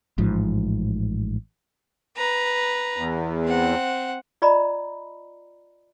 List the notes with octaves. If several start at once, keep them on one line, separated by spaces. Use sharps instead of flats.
A1 G#2 F3
B4 A#5
E2
C4 F#5
F4 D5 D#5 A#5 B5